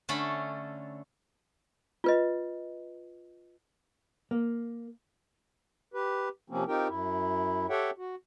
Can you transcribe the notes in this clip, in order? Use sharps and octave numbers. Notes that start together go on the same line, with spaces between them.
D3 A3 C#4 A4 B5
F4 B4 D#5
A#3
G4 B4
C3 F3 A#3 C4 C#4
C4 D#4 F4 G4 A#4 G5
F#2 E4
G4 A4 C#5 E5 F#5 G5
F#4